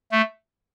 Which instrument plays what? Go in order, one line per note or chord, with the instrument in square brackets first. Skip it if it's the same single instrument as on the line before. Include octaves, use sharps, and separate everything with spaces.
[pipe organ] A3